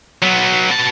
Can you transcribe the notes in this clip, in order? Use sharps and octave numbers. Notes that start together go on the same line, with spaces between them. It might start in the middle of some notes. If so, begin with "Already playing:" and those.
F#3 B3
B2 A5